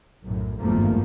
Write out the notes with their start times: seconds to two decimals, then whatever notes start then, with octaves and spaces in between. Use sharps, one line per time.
0.25 B1 F#2 A2
0.60 G#1 E2 G2 F3 A3 A#3